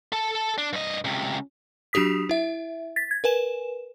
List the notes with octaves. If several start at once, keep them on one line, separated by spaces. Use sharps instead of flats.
A4 A5
D4
G2 D#5
C#2 C3
F#3 D4 F#4 G4 D#6 B6
E4 E5
A6 B6
G#6
A#4 B4 G#5 E7